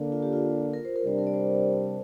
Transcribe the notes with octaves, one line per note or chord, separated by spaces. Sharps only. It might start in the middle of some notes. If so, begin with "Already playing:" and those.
Already playing: D3 A#3 D4
F4
G4
F4
A#4
C5
A#4
C3 G3 D4 C5
A#4
D5
C5